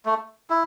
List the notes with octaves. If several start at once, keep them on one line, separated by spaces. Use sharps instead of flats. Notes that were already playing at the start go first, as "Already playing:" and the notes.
A3
E4